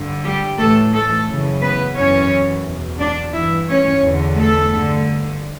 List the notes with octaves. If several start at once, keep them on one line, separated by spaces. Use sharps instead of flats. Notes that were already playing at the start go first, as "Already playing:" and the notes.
Already playing: G2 D3
G3 G4
A2 E3 A3 A4
A3 A4
F#2 C#3 E3
B3 B4
F#2 E3 C#4 C#5
E2 B2
D4 D5
G2 E3 E4 E5
C#4 C#5
E2 D3
A3 A4
G2 D3